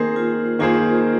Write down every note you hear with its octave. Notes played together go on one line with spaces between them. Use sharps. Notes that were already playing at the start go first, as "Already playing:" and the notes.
Already playing: D#3 A#3 C4 G#4 A#4 C5
F4
D#3 A#3 F4 G#4 C5